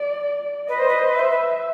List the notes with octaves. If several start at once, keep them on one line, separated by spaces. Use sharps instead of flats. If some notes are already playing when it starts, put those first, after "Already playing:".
Already playing: D5
B4 D#5
C5
B4
C5
B4
E5
C5
B4